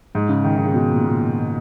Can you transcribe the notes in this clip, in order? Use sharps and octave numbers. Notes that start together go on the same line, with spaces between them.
G#2
C#3
D#3
D#3
C#3
B2
A#2
A#2